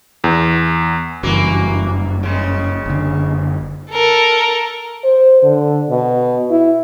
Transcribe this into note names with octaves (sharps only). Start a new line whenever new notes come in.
E2
F#1 G2 E3 A#3 F#4
C#3 G#3
F#1 D3
A4 A#4
C5
D3
B2
E4